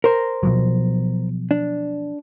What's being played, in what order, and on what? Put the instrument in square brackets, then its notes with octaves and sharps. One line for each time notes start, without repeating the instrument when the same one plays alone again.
[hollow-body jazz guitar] A#4 C5
[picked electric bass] B2 F3 F#3
[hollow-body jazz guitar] D4